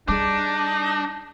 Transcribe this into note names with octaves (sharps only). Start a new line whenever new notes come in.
G3 D4 D#4 G#4 D6